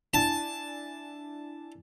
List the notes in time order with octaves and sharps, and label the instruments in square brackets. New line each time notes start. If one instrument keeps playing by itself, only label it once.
[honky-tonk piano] D4 E4 G#5 [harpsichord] A5